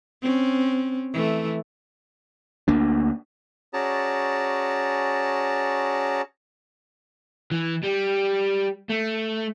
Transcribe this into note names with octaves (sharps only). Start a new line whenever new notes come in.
C4 C#4
E3 A3
D2 A#3 D4
C#4 F#4 G#4 D5 A5 A#5
E3
G3
A3